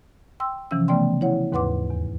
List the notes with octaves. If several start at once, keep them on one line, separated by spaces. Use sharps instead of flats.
G5 C6 E6
C3 E3 F3 C#4 E6
C#3 A3 B3 D5 G5 C6
E4 C#5 F#5
D#2 G#2 B4 F#5 C6 D6
E2